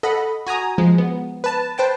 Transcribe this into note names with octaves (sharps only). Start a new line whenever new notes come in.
A4 D#5 F#5 B5
F#4 G#5 A#5 D#6
F3 G#3
B3
B4 A5
B4 C5 G5 A5